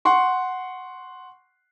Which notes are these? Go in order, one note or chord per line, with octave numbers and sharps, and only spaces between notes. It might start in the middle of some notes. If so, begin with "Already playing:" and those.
F#5 C6 C#6